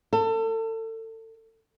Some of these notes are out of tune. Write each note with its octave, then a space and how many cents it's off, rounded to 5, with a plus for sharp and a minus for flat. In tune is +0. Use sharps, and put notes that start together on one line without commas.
A4 +30